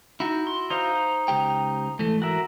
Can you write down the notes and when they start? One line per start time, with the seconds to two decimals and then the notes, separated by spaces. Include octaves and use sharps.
0.20 D#4 E4 F#4
0.47 C6
0.70 D#4 C5 F5
1.28 C#2 G4 G5
1.99 G#2 E3 A3
2.22 F#4 A#4 E5